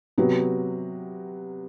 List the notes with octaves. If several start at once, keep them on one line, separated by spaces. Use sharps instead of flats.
C3 F#3 B3